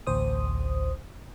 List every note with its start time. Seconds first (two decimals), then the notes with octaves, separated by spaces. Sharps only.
0.07 A1 D2 C5 D#6